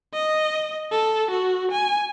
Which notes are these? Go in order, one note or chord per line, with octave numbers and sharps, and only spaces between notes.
D#5
A4
F#4
G#5